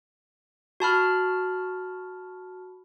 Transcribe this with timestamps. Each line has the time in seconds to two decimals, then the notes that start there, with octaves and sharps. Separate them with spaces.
0.80 F#4 A5 B5 F6